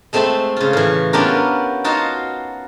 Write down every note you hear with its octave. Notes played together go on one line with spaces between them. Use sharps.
G#3 A3 C4 E5 A5 B5
C#3 F4
A2 E3
B3 C#4 D4 F4 G4 A#4
D#4 F4 F#4 F5 A5